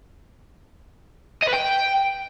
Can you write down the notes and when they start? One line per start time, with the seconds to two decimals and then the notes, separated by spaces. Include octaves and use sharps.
1.43 D#5
1.49 B4
1.54 G5